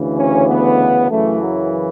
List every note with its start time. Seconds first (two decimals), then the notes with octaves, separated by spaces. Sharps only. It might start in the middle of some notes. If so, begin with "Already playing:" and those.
Already playing: D2 C#3 E3
0.17 C#4
0.47 B3
1.09 F#2 C#3 E3 A3
1.40 F#3